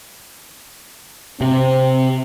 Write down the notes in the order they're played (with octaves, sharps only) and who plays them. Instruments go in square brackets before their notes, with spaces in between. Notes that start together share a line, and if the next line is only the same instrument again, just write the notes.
[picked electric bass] C3 [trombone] C4